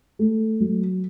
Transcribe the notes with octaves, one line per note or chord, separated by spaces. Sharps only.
A3
F#3